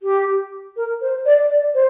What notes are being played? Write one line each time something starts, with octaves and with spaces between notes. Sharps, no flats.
G4
A#4
C5
D5
D5
C5